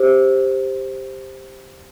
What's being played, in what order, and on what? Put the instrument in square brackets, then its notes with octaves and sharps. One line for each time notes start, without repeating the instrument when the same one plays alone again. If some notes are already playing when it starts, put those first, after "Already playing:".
Already playing: [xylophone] G4 C5